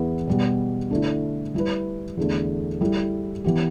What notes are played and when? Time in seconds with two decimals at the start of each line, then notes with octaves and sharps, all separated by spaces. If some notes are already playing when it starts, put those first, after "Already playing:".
Already playing: E2 E3 B3 E4 B4
0.27 B2 G3 B3
0.91 D3 A3 E4
1.54 G3 E4 B4
2.17 E2 D3 A3
2.81 G3 E4 A4
3.44 E3 B3 G4